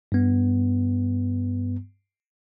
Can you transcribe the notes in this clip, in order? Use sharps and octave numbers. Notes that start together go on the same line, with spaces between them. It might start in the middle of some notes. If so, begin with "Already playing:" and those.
G2 B3